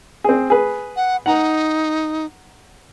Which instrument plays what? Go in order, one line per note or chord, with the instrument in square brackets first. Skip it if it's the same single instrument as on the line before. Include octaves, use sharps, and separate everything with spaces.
[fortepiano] C4 G#4
G#4 B4
[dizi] F#5
[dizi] D#4 [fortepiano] F#5 A#5